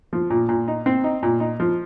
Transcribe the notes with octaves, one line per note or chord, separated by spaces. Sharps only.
F3
A#2
A#2
D#4
C4
D#4
A#2
D#4
F3